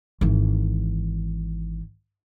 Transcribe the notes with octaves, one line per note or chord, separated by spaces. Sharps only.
G#1 E3